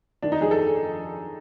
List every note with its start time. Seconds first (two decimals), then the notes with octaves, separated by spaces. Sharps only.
0.22 D#3 D4
0.32 D#4
0.41 F2 G#4
0.51 A4